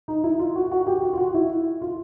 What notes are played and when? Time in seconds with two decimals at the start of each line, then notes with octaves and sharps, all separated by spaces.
0.08 D#4
0.24 E4
0.39 F4
0.56 F#4
0.72 F#4
0.87 G4
1.03 F#4
1.13 F4
1.18 F#4
1.34 E4
1.82 F4